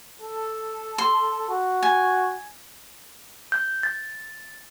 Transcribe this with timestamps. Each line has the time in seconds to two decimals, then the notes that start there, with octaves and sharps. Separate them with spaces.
0.21 A4
0.98 C6
1.49 F#4
1.83 G#5
3.52 G6
3.83 A6